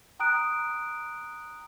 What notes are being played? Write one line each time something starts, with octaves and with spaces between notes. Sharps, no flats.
G5 A#5 D#6 F#6 D7